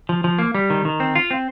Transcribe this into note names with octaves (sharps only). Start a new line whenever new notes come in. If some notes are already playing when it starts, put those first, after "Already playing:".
F3
F3
A#3
G3
D#3
D#3
C4
F4
C4